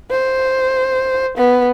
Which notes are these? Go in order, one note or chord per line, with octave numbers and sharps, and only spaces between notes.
C5
B3